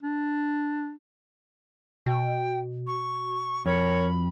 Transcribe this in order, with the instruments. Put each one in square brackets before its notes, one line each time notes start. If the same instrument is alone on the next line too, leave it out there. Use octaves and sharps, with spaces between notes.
[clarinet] D4
[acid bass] B2 [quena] G5
[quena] C#6
[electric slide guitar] F2 [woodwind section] A#4 C#5 [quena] B5